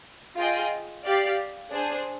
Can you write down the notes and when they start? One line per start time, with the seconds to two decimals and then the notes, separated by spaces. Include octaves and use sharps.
0.37 F4 G#4 D#5 G5
1.05 G4 D5 F5
1.71 D4 G#4 C5